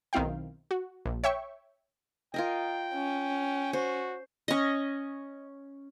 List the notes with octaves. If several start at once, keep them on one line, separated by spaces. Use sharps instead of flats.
B1 D#3 C4 E4 F5 G5
F#4
A#1
C#5 E5 G5 C#6
F4 A#4 D#5 G5
C#4
F#4 C5
C#4 D#5